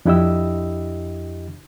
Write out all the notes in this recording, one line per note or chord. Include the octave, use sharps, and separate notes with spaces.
F2 D4 E4 G4 D#5 E6